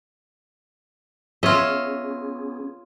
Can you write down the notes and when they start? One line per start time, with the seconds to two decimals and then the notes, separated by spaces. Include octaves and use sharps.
1.43 B3 C#4 F4 G#4 C#5 D#5 E5